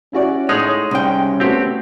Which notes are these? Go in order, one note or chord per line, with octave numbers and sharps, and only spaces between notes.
C#4 E4 F#4 D5
A2 G#3 D#4 G#4 C#5 D#6
C2 C#4 G5
A3 B3 C4 F#4 G4